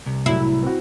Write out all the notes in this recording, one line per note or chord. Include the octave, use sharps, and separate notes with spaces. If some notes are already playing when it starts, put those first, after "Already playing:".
C2
A2 F#3 E4
C4 F#4